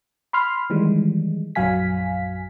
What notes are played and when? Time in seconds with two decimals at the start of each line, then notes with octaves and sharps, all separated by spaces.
0.33 B5 C6 F6
0.70 D#3 E3 G3 G#3
1.55 A#1 F#2 F#3 F5 G#5 B6